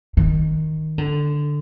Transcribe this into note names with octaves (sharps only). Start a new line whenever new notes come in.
D#3
D3